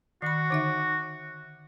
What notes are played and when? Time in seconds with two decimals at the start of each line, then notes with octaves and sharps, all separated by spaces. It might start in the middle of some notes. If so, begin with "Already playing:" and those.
0.22 D#3 F#4 B5
0.50 D3 D#4 E5